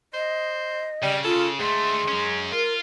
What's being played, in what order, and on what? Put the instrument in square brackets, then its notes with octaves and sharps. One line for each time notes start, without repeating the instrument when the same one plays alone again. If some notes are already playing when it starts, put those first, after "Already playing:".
[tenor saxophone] C5 [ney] D#5
[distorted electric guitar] C#3 [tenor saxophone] G3
[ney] F4 [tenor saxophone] A4
[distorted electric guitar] D2 A3 [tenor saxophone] G#3 [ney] C6
[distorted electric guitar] F#3 C#4
[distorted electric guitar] F4 [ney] A#4